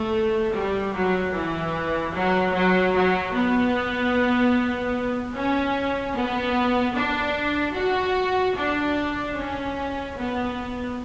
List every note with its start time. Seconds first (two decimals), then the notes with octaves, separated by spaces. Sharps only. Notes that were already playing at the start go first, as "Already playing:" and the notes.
Already playing: A3
0.52 G3
0.93 F#3
1.33 E3
2.13 F#3
2.53 F#3
2.94 F#3
3.33 B3
5.34 C#4
6.14 B3
6.94 D4
7.75 F#4
8.55 D4
9.35 C#4
10.16 B3